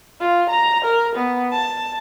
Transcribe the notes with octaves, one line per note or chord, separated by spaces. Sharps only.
F4
A#5
A#4
B3
A5